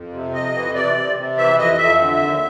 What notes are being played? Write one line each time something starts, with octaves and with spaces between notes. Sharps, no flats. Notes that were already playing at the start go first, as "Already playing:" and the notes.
Already playing: F2
C3
F2 D#5
E3
C3 D5
C3
C3
E3 E5
F2 D#5
F2 E5
D3
D#2